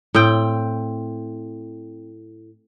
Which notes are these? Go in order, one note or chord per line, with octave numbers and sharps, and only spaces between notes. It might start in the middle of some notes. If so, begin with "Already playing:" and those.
A2 C4 G5